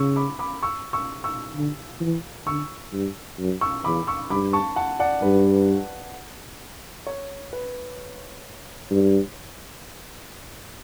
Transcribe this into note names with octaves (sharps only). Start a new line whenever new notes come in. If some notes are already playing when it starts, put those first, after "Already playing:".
Already playing: C#3 C#6 E6
B5 D6
B5 D6
C#6 E6
C#6 E6
C#6 E6
D3
E3
D3 C#6 E6
G2
F#2
C#6 E6
E2 B5 D6
C#6 E6
G2 B5 D6
A5 C#6
F#5 A5
D5 F#5
G2 B4
C#5
B4
G2